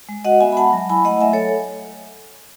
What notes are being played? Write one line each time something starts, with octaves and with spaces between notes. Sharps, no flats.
G#3
F#4 D#5 F#5
B3 E5 G#5
B5
G#3 F#5 A5
F#3
E4 G#5 B5
A3 D#5 F#5
F#3 E5 G#5
A4 C#5